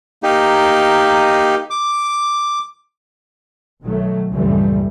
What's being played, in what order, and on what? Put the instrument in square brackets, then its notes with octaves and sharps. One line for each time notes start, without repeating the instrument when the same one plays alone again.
[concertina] A#3 D#4 G4
D6
[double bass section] B1 D#3 F#3 A3
C#2 G2 A#2 E3 G3 A3